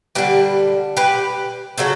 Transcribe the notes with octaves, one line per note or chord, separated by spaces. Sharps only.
D3 G3 G4 B4
G4 B4
C#3 F#3 F#4 A4